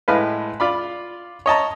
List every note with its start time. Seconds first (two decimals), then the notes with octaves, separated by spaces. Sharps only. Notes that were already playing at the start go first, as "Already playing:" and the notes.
0.08 A2 G#3 B4 F5
0.60 F4 D5 B5
1.46 C#5 D#5 A5 A#5